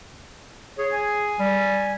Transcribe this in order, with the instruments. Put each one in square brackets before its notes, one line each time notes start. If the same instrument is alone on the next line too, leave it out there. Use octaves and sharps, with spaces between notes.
[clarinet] G#4 [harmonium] C#5
[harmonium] G#5
[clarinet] G3